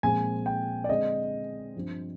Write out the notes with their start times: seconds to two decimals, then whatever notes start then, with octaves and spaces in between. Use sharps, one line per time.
0.03 A#2 F3 G#3 C4 G#5
0.46 G5
0.84 D5
0.89 D3 G#3 C4 D#5
1.76 G2 F3 C4